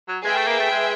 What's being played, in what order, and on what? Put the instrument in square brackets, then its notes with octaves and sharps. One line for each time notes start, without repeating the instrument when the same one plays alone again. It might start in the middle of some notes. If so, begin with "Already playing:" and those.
[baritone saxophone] F#3
[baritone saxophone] G#3 [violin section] G#4 B4 E5 G5
[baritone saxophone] A3
A#3
A3
G#3